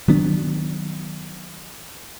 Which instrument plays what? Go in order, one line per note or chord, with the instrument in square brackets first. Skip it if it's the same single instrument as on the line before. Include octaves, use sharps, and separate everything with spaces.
[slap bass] D#3 F#3 B3 D4